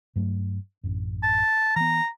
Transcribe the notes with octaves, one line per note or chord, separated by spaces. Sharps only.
G2 F#3 A3
A1 F#2
A5
E3 B3 A#5